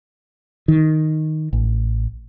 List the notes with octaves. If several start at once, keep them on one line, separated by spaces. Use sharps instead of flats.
D#3
A1